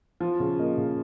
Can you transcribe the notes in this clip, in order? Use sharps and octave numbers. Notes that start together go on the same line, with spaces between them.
F3
C#3
A#3 D#5
C#3